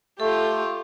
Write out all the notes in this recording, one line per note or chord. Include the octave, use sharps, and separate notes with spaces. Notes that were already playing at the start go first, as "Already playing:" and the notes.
A3 F4 G4 A4